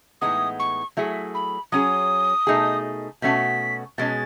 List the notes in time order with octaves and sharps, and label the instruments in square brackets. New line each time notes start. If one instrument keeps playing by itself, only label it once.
[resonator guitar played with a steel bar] A2 E3 G#3 B3 D#4 [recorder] D#6
[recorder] C#6
[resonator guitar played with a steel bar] F#3 A3 E4 G#4
[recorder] B5
[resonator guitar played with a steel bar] F#3 C#4 G#4 [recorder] D#6
[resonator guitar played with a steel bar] B2 A3 D#4 G#4
[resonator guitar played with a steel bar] B2 A3 C#4 F#4 [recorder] B6
[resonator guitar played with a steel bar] B2 G#3 C#4 [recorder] A6